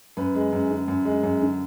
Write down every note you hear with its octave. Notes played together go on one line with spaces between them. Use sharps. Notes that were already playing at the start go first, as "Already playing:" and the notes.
F#2 B4
G#3
F#2
D3
F#2
G#3
F#2
D3